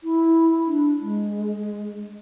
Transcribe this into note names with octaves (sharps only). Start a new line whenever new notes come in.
E4
D4
G#3